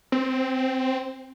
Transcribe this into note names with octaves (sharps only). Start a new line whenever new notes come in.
C4